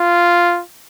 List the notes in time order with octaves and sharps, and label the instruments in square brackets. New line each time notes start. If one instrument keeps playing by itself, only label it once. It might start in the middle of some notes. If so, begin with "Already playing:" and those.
Already playing: [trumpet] F4